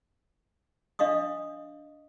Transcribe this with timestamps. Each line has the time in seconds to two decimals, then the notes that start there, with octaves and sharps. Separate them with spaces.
0.99 D4 D#5 F5 C#6 D#6